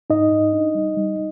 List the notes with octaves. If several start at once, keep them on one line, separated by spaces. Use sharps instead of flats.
G#2 D#4 D#5
G#2
D4
G3
G3